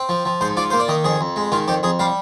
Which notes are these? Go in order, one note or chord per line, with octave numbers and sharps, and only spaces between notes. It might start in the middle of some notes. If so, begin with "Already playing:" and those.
Already playing: C4
F3
F3
G#2 C5
F4 D5
A#3 C5
D5
D#3 D#5
F2 G#4
F2
G#3
D#3 F4
F2 G4
F2 G#4
G3 F5